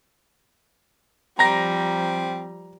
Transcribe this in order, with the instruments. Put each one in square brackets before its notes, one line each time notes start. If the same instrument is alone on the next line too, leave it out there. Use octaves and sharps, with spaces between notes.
[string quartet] F3 G3 [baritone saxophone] C4 [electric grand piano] A#5 A#6